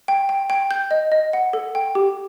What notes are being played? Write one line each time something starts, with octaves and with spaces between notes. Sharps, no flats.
G5
G5
G5
G6
D#5
D#5
F#5
A4
G5
G4